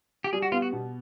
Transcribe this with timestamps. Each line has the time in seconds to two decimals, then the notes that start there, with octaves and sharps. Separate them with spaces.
0.24 G4
0.33 G3 G#4
0.42 F#4
0.52 B3 F4
0.62 F#4
0.73 B2